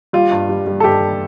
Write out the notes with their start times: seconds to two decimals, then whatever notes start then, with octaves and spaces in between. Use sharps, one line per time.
0.13 G3 F4
0.31 G2
0.49 G3
0.67 G3
0.80 A4
0.84 G2 G4